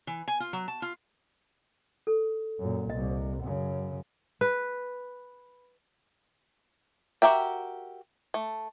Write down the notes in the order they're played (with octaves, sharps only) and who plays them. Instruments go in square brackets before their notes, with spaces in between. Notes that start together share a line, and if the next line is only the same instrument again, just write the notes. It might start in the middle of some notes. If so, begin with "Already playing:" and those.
[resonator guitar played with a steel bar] E3
G#5
F4
F#3
A5
F4
[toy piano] A4
[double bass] F#2 A#2
[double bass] C2 [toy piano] D#5
[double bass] F#2 C#3
[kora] B4
[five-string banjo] F#4 G4 A#4 E5 G5
A3